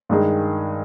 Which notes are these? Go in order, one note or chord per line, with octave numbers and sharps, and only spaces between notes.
G2 D#3 G#3 D#4 G#4